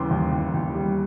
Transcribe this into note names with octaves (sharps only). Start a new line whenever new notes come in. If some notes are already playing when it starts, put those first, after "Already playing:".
Already playing: D#2 C#3 E3 G3 C6 D6
D#2
D#2
D#2
G3